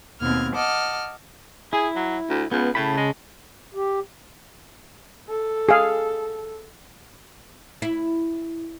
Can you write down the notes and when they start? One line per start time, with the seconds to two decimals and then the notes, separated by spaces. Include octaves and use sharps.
0.21 D#2 B2 C4 F6 G#6
0.55 D#5 F#5 A5 D6 F6
1.73 E4 G#4
1.96 F#3
2.29 D2
2.52 C#2 B3
2.75 A2 C#3 A5 B5
2.97 G#3
3.74 G4
5.29 A4
5.69 G#4 F5
7.82 E4